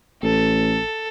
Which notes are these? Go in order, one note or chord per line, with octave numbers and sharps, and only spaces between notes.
A1 A4